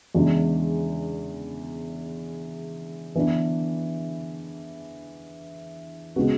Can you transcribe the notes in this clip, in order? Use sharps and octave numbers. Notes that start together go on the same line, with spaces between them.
E2 C#3 E3 G#3 D4
E3 B3 D4
C#3 G#3 B3 F#4